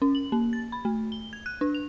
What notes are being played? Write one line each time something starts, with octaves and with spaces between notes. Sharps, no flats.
C#4
F#7
A#3
A6
B5
A3
G7
G#6
F#6
D4
F7